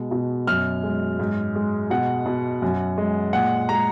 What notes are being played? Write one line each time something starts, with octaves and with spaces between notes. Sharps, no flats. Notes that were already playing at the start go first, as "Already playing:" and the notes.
Already playing: B2 G#3
B2
F#2 F6
G#3
G#2
G#3
B2 F#5
B2
F#2
G#3
A#2 F#5
G#3 A#5